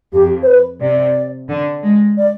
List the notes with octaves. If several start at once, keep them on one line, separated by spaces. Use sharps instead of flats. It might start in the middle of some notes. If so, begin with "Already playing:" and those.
F2 G4
C5
B4
C3 D5
D3
G#3
D5